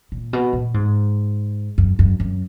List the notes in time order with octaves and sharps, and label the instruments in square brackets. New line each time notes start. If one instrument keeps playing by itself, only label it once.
[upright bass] A#2
B2
A#2
G#2
F#2
F#2
F#2